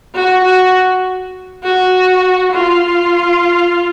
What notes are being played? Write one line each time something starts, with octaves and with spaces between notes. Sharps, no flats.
F#4
F#4
F#4
F4